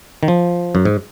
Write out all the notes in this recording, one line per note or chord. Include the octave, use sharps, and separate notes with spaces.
D#3
F3
F#2
G#2